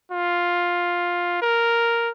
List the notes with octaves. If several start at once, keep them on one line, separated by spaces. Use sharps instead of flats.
F4
A#4